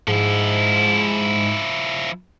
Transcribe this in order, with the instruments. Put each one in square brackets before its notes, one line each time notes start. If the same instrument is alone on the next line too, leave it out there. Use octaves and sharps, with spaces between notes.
[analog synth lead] G#2 [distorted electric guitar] F3 E4